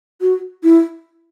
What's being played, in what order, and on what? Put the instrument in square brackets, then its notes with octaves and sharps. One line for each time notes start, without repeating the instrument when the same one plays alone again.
[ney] F#4
E4